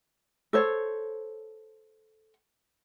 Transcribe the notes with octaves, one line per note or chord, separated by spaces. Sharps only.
A4 C5 C#5